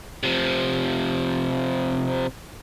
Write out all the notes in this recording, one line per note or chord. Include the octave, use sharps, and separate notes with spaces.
C3 F3